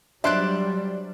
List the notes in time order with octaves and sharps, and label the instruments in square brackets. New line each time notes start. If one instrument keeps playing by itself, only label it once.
[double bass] F#3 G3 [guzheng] D4 C5 D5 [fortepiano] E5 C6 F#6